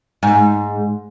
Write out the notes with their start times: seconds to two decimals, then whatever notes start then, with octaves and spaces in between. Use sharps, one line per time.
0.23 G#2